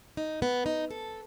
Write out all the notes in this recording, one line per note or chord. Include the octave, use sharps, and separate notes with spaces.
D#4
B3
D#4
A4